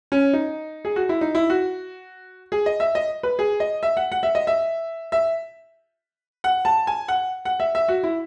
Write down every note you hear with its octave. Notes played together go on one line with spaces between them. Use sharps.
C#4
D#4
G#4
F#4
E4
D#4
E4
F#4
G#4
D#5
E5
D#5
B4
G#4
D#5
E5
F#5
F#5
E5
D#5
E5
E5
F#5
A5
G#5
F#5
F#5
E5
E5
F#4
E4